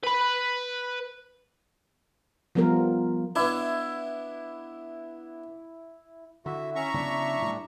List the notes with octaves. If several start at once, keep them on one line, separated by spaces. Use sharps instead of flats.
B4 B5
F3 G3 B3 F4 A#4
B3 D4 E4
D3 E4 F#4 E5
C#4 E5 A#5 C#6
C#3 F#3 B3 D4
A2 G3